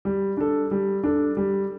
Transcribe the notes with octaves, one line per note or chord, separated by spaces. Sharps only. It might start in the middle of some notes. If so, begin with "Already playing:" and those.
G3
D4 A4
G3
D4 A4
G3